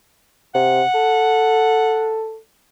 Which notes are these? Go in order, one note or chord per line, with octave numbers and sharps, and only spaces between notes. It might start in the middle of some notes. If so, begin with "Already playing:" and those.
C3 F#5
A4